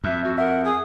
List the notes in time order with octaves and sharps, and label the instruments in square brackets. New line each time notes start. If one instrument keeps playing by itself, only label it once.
[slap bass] F2 [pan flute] E5
[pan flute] F#4
[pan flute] A#4 [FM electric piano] E5 [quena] F#5
[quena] G#4 [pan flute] D#6